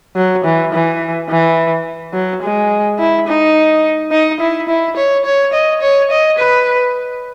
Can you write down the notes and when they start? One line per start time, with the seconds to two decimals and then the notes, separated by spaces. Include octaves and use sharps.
0.16 F#3
0.45 E3
0.72 E3
1.29 E3
2.14 F#3
2.42 G#3
2.99 E4
3.27 D#4
4.12 D#4
4.40 E4
4.69 E4
4.97 C#5
5.25 C#5
5.53 D#5
5.81 C#5
6.11 D#5
6.38 B4